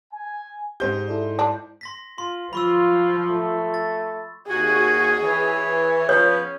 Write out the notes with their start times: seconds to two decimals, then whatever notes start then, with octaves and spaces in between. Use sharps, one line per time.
0.13 G#5
0.80 G#2 G4 C5 G6
1.08 E4 A4 D5
1.39 D4
1.81 C6 A#6 B6
2.18 F4 C6
2.53 F3 F4 B5 C#6 E6
3.30 A3
3.74 A6
4.50 D#2 F#4 G#4 G#5
5.23 E3 C#5
6.09 F3 B3 C#4 C#5